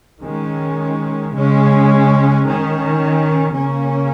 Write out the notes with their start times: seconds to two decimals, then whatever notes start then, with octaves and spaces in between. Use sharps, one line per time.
0.22 D#3 G#3 C#4
1.33 C#3 G#3 C#4
2.44 D#3 C#4
3.53 C#3 A#3 C#4